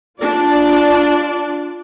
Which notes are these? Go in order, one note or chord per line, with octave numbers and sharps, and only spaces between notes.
D4 F4 D5